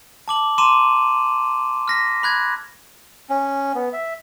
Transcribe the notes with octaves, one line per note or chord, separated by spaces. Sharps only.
A5 D6 F#7
A#5 C6 D6 D#7 E7
F6 A#6 B6
B5 F#6 G#6
C#4
B3
E5